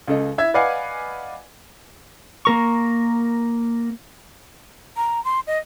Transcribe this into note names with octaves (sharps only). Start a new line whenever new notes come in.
C#2 C#3 A4 D#5
E4 E5 G#6
B4 D5 D#5 F5 F#5 G#5
A#3 A#4 C#6
A#5
C6
D#5